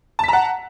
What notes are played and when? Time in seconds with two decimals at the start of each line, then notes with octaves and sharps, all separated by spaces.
0.19 A5
0.24 B6
0.28 A#5
0.33 F#5